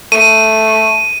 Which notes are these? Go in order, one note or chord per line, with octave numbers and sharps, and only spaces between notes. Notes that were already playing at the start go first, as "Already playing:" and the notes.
A3 D#7